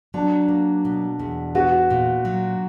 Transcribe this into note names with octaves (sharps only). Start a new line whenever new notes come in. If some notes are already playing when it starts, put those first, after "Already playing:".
F#3 D4
A#3
B2
E2
B3 F#4
A#2
F#3